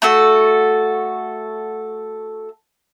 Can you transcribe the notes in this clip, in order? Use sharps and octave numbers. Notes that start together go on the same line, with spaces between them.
A3 F#4 A4